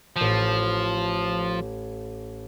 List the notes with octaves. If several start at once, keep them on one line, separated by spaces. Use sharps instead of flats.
A1 F3 G6